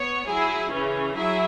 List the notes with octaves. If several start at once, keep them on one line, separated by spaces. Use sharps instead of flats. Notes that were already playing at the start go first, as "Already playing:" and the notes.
Already playing: B3 C#5
F#3 E4 G#4
C#3 E3 C#4
F#3 E4 G#4 E5